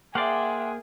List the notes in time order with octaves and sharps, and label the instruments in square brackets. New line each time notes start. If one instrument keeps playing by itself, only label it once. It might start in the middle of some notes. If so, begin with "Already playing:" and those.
[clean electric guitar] A#3 C5 D5 [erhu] G#4 [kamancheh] E5 G5 [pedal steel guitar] F#5 C6